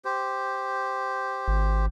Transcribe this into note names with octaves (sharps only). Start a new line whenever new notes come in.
G4 C5
G#1